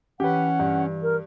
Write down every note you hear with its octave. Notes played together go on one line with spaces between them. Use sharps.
E3 C#4 G4 B4 F#5
G2
A#4